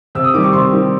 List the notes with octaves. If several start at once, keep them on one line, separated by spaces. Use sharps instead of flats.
C3 E6
D#6
D#3 G3 D6
C#6
C3 C6
D#3 G3